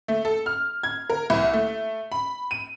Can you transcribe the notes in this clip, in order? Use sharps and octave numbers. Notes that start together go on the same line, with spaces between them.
A3
A4
F6
G#6
A#4
C2
A3
B5
D#7